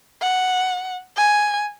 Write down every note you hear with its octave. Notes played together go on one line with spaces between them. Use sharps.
F#5
G#5